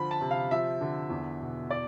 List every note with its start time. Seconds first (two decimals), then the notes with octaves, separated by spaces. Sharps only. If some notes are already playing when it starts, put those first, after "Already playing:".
Already playing: D3 F3 B5
0.11 A5
0.21 C3
0.31 F5
0.51 F3 E5
0.81 D3
1.10 E2
1.41 B2
1.70 D5